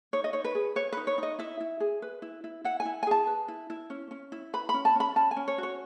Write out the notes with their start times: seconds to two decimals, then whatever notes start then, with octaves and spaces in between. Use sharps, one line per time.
0.13 D#4 C#5
0.24 D#5
0.33 D#4 C#5
0.44 B4
0.55 G#4
0.76 B4 C#5
0.92 D#4 B4
1.07 C#5
1.18 D#4 D#5
1.39 E4 E5
1.60 E4
1.80 G#4
2.02 B4
2.22 E4
2.44 E4
2.64 E4 F#5
2.80 G#5
2.85 E4
3.03 G#5
3.07 G#4 A5
3.27 B4
3.48 E4
3.70 E4
3.90 C#4
4.11 C#4
4.32 E4
4.53 B4 B5
4.69 B5
4.74 C#4
4.85 A5
4.95 C#4 B5
5.16 C#4 A5
5.31 G#5
5.36 C#4
5.48 C#5
5.58 F#4 C#5